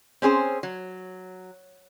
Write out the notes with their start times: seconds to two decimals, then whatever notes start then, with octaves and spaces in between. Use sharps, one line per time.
0.22 C4 C#4 G#4 C5
0.63 F#3